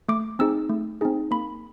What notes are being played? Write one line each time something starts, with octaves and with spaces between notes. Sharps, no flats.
A3 D6
C4 D#4 G#4 E6
A3
C4 D#4 G#4
A#3 B5